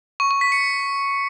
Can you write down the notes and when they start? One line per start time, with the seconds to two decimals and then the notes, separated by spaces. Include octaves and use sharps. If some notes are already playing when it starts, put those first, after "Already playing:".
0.20 C#6
0.31 C#6
0.41 B6
0.52 C#7